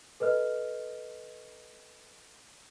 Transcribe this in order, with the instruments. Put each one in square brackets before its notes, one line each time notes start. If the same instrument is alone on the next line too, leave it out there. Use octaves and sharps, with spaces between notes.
[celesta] A4 B4 D#5 F6